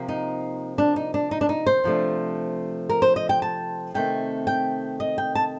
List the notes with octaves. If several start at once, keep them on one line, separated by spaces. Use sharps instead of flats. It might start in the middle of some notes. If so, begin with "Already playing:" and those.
Already playing: C3 F3 A#3
D#4
D4
D#4
D4
D#4
D4
D#4
C5
C3 F3 A3 D4
A#4
C5
D#5
G5
A5
C3 D#3 A3 C4 G5
G5
D#5
G5
A5